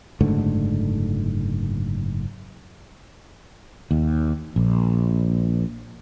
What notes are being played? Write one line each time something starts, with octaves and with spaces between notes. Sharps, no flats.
F#1 G#2 D3 A3
D#2
A#1